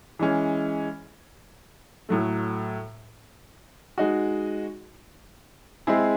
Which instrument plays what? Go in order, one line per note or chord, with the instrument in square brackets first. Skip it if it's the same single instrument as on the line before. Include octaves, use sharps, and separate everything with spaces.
[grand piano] E3 G#3 C#4
A2 F#3 A3
G#3 D#4 F#4
G#3 C4 E4 G#4